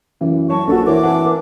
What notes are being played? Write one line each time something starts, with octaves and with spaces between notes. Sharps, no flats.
F#2 E3
F#3 C#5 A5 C#6
A#1 B3 C#4 D4 F#4 A4
E3 A#4 C5 C#5 D6
C4 D4 F#5 G#5
A#4 B4